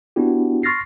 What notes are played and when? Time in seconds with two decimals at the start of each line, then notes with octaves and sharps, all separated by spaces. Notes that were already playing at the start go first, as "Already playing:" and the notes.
0.16 B3 D4 E4 F#4 G4
0.63 C6 C#6 F6 A6 A#6 C7